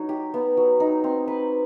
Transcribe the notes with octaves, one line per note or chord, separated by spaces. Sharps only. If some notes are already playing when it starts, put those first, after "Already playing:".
Already playing: F#3 D#4
G4
B3
F#3
D#4
C4
B4